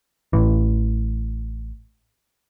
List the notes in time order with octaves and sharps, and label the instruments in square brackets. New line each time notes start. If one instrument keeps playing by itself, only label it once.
[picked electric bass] A1 E3